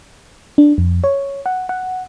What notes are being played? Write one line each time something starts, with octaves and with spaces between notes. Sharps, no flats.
D4
F2
C#5
F#5
F#5